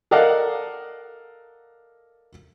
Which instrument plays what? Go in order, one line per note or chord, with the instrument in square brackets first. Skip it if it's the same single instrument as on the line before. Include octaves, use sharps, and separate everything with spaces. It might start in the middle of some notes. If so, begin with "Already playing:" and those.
[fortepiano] A4 A#4 D5 D#5 F5 F#5